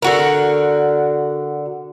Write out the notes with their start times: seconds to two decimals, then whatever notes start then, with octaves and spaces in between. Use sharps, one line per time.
0.02 D3 F#4 A#4